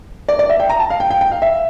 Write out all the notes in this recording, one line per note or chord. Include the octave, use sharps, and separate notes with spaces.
D5
D5
E5
G5
A#5
A5
F5
G5
G5
G5
F5
E5